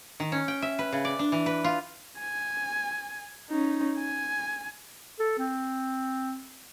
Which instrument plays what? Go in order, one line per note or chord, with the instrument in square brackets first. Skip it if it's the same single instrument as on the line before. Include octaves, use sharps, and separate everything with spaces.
[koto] D#3
C#4
G5
E5
B4
C#3
D5
D4
E3
B4
F4
[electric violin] G#5
C#4 D#4
G#5
[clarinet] A4
C4